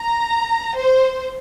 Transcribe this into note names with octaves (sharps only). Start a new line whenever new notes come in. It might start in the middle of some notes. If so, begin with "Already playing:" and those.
Already playing: A#5
C5